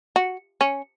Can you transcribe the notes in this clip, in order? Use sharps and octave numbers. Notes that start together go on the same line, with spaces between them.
F#4
C#4